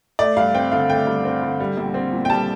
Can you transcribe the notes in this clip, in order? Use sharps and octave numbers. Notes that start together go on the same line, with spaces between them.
A3 D5
G2 F5
C4 G5
D3 F5
A3 G5
G2
C4
D3
G3
A#1
C4
A#2
G5
G3 A5